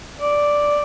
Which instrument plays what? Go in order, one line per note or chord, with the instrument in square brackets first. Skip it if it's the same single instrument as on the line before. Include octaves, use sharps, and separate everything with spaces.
[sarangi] D5